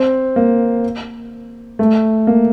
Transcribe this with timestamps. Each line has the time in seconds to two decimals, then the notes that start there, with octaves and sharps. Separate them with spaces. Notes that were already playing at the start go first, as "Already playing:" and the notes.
Already playing: C4
0.36 A#3
1.79 A3
2.27 A#3